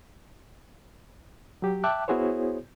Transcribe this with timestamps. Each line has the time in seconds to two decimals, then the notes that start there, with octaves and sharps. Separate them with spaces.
1.62 F#3 G4
1.84 E5 G5 A5 D6 F#6
2.08 B3 E4 F#4 G#4 C5 C#5